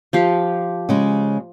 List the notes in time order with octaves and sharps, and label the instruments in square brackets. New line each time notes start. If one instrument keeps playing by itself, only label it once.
[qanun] F3 G4 F5
[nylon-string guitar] C#3 G#3